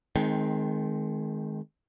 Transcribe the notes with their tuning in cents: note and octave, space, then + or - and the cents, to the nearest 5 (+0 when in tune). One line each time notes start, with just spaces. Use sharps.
D#3 +0 G#3 +30 C4 +0